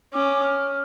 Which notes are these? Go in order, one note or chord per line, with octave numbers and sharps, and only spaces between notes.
C#4 D6
F6